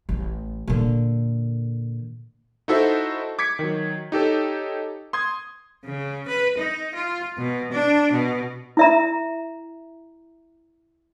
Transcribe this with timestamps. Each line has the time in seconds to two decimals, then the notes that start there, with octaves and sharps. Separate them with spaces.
0.09 A1
0.68 A#2 D3
2.68 D#4 E4 F#4 A4 C5 E5
3.39 D6 G#6 B6 C#7
3.59 D#3 F#3
4.12 D#4 G4 A4 C#5
5.13 C6 D#6 G#6
5.85 C#3
6.28 B4
6.58 D#4
6.94 F4
7.38 B2
7.72 D4
8.11 B2
8.77 E4 E5 A#5